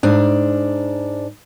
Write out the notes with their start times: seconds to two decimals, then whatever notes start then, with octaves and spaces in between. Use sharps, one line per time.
0.03 G#2 D4